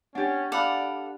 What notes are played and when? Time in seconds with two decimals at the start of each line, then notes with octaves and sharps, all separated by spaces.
0.15 C#4 D4 G4 F#5 A6
0.52 A4 D5 F5 F#5 B5 D6